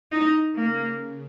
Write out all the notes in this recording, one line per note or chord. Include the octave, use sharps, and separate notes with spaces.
D#4
C#3 A#3